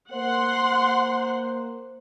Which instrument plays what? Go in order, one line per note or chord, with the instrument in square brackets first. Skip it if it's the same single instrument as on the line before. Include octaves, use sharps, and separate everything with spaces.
[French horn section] A#3 C5 [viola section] F#5 C6